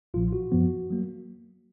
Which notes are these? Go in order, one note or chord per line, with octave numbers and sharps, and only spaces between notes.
A#1 A#2 F3 F4
F#4
F#2 F3 B3
F#3 A#3